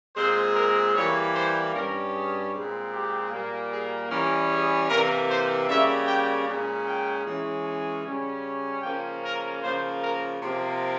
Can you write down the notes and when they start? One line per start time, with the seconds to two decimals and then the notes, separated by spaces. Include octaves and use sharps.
0.16 A#2 G#3 C4 C5
0.55 A#4
0.95 E3 G3 A#3 C#5
1.35 C5
1.73 G2 G3 C#4 A#4
2.13 G#4
2.53 A#2 G#3 C4
2.92 G4
3.31 A#2 G3 A#3
3.71 G#4
4.10 E3 G3 C#4 A#4
4.49 G#4
4.89 C3 E3 A#3 A#4
5.28 C5
5.67 C#3 G3 A#3 E5
6.07 G5
6.46 A#2 G#3 C#4
6.86 G5
7.25 E3 G#3 C#4
7.64 G#5
8.04 C#3 G3 C#4
8.82 C#3 F3 A#3 C#4 G5
9.22 A#4
9.62 C#3 F3 A#3 C5
10.01 A#4
10.40 C3 F3 A#3